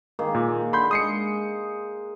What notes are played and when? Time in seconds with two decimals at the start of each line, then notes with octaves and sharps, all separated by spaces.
0.19 D#3 A#3 G#4
0.35 A#2
0.73 D3 B5 C6 G6
0.91 G#3 D#6 C7 C#7